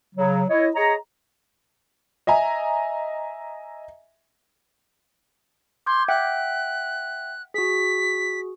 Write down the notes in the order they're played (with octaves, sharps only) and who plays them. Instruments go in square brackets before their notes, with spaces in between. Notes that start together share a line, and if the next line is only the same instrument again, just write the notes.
[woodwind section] C#3 F#3
E4 C#5 D#5
G#4 C#5 D#5 A#5
[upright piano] D#5 E5 G#5 A#5
[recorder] C6 [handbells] D6 G6 G#6
[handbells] E5 F#5 G5 [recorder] F#6
[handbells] F#4 G#4 [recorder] B6